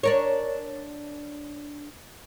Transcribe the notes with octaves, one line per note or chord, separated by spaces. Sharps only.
D4 A#4 C#5